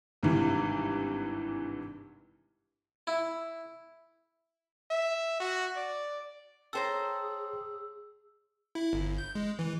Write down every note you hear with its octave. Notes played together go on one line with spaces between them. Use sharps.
G#1 G2 C3 E3
E4
E5
F#4
D5
G#4 A4 C5 C#5 G5 A5 A#5 E6
E4
G1
G6
G#3
E3